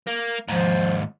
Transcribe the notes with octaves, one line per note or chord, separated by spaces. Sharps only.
A#3
D#2 G#2 F3